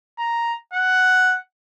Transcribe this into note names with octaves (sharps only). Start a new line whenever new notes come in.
A#5
F#5